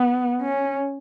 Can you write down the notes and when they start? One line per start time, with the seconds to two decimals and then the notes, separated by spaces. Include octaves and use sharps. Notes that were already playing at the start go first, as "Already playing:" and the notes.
Already playing: B3
0.42 C#4